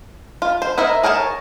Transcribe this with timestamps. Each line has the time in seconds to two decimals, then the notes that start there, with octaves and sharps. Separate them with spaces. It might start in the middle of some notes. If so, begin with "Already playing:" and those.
0.42 F4
0.62 C5
0.78 D#4 E4 A#4 E5
1.03 G#4 A#4 C#5 G5 A5